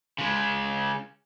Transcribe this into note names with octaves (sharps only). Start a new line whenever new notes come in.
C#3 G#3